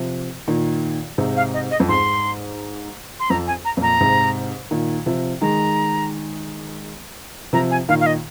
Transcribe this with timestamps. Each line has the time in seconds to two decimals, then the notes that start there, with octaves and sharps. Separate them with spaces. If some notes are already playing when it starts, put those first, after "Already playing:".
Already playing: C3 F3
0.48 A#2 D#3
1.18 G#2 C3
1.37 F5
1.54 D#5
1.71 D#5
1.80 F2
1.89 G#2 C6
3.20 C6
3.30 F2 A#5
3.47 G#5
3.65 A#5
3.77 F2 A#2
3.82 A#5
4.00 G#2 C3
4.71 A#2 D#3
5.06 C3 F3
5.41 D#3 G#3 A#5
7.53 C3 F3 A#5
7.71 G#5
7.89 A#2 D#3 F5
8.01 F5
8.06 D#5